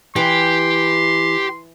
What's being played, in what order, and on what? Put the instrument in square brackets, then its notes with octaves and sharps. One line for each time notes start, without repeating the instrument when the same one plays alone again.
[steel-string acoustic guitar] E3 [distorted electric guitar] G4 [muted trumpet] C6